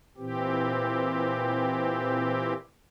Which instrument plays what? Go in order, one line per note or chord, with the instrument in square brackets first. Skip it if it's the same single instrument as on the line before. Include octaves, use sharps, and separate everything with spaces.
[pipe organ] A#2 E3 C4 G4